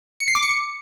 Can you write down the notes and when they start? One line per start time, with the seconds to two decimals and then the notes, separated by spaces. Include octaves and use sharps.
0.20 C#7
0.28 C7
0.35 D6
0.42 C#7